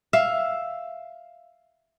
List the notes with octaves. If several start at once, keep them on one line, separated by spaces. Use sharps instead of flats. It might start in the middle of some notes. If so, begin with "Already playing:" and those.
E5 F5